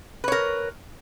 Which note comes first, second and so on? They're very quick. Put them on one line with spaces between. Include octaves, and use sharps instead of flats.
B4 C#5 A#4